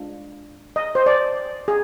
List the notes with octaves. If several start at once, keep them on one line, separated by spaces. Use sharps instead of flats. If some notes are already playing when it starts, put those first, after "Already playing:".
Already playing: G#3 D4 F4
D#5
C5
D5
G#4